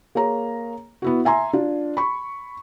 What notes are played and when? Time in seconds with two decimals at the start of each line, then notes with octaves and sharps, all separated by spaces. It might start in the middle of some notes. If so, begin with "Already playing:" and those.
0.15 A#3 G#4 C#5 A#5
1.02 B3 E4 F#4
1.25 E5 G#5 A#5 C6
1.53 D4 F4
1.97 B5 C#6